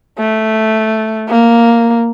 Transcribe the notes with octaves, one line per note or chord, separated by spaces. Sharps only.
A3
A#3